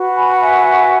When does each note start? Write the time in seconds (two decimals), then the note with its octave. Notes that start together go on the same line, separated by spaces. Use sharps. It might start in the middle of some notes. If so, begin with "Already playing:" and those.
Already playing: F#4 B4
0.15 G#5 B5
0.38 E5 G#5